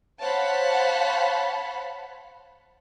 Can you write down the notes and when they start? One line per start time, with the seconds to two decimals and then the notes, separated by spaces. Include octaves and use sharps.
0.20 C5 C#5 F5 F#5 A5 B5